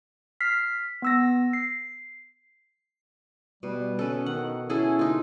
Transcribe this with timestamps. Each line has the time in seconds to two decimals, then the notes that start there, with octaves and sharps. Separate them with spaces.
0.41 F6 B6 C7
1.02 B3 E6 A#6
1.53 C7
3.63 B2 G3
3.99 C#4 A4 B4
4.26 D#3 F#5
4.70 C#4 E4 G#4 A4
4.99 D#4 F4